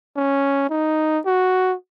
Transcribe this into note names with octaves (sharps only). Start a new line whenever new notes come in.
C#4
D#4
F#4